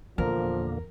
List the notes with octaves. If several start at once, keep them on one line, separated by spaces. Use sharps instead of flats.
E2 A#2 D3 F3 A#3 A#4